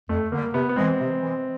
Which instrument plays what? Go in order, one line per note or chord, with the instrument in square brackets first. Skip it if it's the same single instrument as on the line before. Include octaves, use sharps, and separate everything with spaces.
[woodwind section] F2 [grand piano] A3
[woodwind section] D3 G3 [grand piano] A#3
[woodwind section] C3 [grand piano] B3
[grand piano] B3
[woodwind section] E3 G#3 [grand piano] C4
[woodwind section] C3
E3 G#3